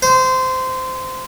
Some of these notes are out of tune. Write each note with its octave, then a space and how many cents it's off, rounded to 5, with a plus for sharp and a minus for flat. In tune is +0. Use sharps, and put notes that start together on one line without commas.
C5 -20